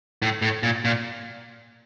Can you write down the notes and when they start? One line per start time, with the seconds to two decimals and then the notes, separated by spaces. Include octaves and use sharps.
0.22 A2
0.42 A2
0.63 A#2
0.85 A#2